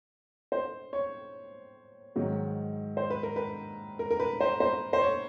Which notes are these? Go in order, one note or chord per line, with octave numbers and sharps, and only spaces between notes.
C5
C#5
G#2 D#3 F#3
C5
B4
A#4
B4
A#4
A#4
B4
C5
C5
C5
C#5